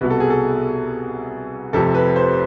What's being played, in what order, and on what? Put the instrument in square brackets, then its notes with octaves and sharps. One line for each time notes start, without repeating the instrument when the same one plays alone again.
[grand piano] C2 B2 B3 B4
A4
G#4
A4
F1 F2 C3 A4
B4
C5